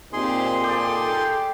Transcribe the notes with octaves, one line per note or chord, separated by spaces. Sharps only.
A#2 C4 D#4 G4 G#4 C6
G4 A4 D5